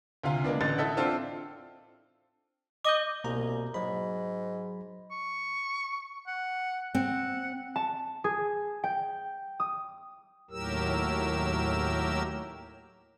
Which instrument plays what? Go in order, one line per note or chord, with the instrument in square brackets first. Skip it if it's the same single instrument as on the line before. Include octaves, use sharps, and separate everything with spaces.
[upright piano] D2 C3 F4 F5
G#3 A#3 B3 D4
A1 D3 A6
E4 A4 D#5 E5 F#5
C4 D4 F4 A4 F5
[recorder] D#5 [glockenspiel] D6 G6
[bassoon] C2 [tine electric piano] B2 A#3 A#5
[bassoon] G#2 [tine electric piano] F#3 B5
[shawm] C#6
F#5
[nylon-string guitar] C4 [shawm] F#5
[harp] A5
G#4
G5
D#6
[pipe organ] D#2 A2 F#3 G4 A#4 E6